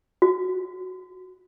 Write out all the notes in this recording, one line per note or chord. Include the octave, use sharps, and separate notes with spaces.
F#4